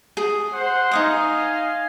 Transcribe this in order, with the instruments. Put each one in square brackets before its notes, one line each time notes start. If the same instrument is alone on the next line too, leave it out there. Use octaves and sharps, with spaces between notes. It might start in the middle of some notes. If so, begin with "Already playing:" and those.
[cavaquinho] G#4
[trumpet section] C5 F#5 C6
[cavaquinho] D#4 C6 D#6 [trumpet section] D#5 F5 G#5